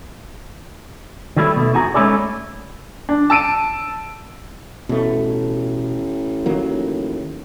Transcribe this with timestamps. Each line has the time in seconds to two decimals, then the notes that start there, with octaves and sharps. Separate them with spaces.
1.37 D#3 F#3 G3 A3 E4
1.56 B2 A3
1.74 E2 D#4 F#4 G#4 A#5
1.94 G#3 A3 C#4 E4 G#4 D5
3.09 D4
3.30 A5 E6 D7 D#7
4.89 A1 B2 A3
6.46 D#3 F#3 A#3